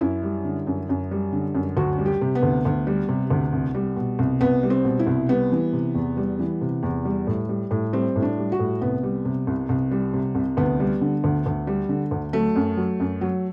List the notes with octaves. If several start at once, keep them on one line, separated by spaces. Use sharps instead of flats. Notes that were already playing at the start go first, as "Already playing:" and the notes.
F#2 E4
G3
D3
F#2
F#2
G3
D3
F#2
D2 F#4
G3
G4
C3
B3
D2
D2
G3
C3
D2
C2
G3
B2
C2
C2 B3
G3
C4
B2
E4
C2
G3 B3
E3
C3
E2
G3
E3
C3
E2
G3
A2
G3
A2
G3 C4
A2
D4
G3
F#4
A2
C2 B3
G3
C3
C2
C2
G3
C3
C2
D2 B3
G3
D3
D2
D2
G3
D3
D2
F#3 A3
F#2
F#3
F#2
F#3